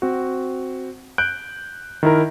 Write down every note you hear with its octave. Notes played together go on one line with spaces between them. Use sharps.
C4 F#4
F#6 G6 D7
D#3 E4 A#4